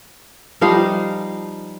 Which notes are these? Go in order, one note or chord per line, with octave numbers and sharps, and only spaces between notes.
F3 G3 D#4 F5